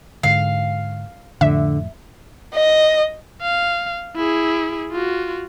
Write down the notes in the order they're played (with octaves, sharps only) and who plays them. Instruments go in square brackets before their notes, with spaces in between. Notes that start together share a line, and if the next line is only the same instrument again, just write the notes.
[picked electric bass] G#2 D3 [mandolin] F5
[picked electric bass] F2 A2 [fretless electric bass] D3 [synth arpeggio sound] E5
[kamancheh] D#5
[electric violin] F5
E4 G#4
F4 F#4